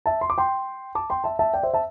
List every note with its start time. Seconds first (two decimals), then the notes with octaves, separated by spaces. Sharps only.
0.06 E5 A5
0.21 C6
0.30 D6
0.38 G5 C6
0.95 A5 D6
1.10 G5 C6
1.24 E5 A5
1.39 E5 A5
1.54 D5 G5
1.63 C5 E5
1.74 E5 A5